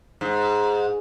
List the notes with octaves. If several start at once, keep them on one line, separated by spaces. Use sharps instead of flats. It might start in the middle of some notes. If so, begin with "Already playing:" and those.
G#2